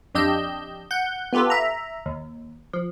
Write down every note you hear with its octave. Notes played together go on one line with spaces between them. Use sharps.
F2 D4 G4 D#5 E6 G6
F#5 G6
B3 F4 G4 A4 B4
E5 A#5
D#2
F3